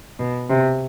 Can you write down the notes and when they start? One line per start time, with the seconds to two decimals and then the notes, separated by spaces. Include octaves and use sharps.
0.19 B2
0.49 C3